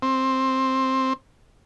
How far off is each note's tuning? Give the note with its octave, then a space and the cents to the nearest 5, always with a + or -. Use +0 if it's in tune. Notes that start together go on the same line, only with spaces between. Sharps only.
C4 +10